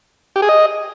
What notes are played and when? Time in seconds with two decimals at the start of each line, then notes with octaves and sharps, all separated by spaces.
0.36 G4
0.42 G#4
0.49 D#5